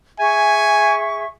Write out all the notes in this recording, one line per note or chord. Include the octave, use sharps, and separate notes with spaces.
G#4 E5 G#5 C#6